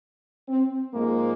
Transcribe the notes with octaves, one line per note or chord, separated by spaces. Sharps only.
C4
G#2 F3 G#3 A#3